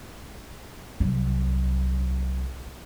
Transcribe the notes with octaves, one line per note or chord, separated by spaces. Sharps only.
C2 F#3